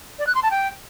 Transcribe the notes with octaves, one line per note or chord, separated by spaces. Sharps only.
D5
F#6
C6
A5
G5